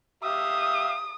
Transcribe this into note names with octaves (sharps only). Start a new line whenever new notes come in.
G4 E5 F5 D#6